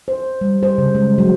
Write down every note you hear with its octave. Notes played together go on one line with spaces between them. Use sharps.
C5
G3
C5
C#3
G#3
F#3